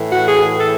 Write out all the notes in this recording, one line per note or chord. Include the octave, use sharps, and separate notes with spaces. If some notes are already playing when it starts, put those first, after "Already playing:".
Already playing: A2 E3
F#4
G#4
A4